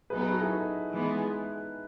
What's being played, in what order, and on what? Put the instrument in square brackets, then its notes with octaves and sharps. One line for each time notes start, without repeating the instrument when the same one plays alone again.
[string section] F#3 B3 D#4 [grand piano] G#4 B4
[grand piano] G#4 B4
F#4 A4
E4 G#4
D#4 F#4
[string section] E3 G#3 B3